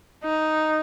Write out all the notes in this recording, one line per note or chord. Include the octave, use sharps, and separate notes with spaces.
D#4